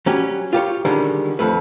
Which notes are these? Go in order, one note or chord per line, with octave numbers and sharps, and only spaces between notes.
F#3 G3 C#4 G4
F4 G4 B4 C#5
D3 D#3 G3 G#3 C#4
F2 A3 B4